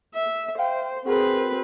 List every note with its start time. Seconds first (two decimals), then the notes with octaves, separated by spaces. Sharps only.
0.14 E5
0.58 C5 E5 F5 G5
1.06 C4 F#4 G#4 A#4 B4